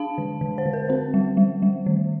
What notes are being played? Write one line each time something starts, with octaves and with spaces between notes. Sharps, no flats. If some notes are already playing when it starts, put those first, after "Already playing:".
Already playing: D4 F5 A5
D3
D3
C5
D3
A#4
C4 C5
G3
G3
G3
D#3